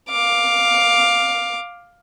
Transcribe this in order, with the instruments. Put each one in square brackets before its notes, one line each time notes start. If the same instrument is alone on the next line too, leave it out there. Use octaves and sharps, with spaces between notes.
[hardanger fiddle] F5 D6